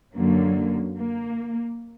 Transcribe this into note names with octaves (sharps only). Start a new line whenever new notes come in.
F#2 D3 F#3 A#3
A#3